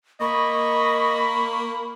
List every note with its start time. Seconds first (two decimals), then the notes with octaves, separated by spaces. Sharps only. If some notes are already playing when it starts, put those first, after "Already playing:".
0.21 A#3 D#5 B5 C#6